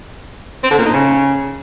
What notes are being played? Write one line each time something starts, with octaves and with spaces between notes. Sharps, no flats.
C4
D3
A#2
D#4
C#3